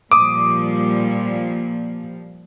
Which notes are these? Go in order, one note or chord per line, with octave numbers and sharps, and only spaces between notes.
A#2 F3 G3 D6 D#6